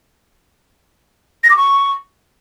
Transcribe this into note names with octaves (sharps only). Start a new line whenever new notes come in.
A#6
D6
C#6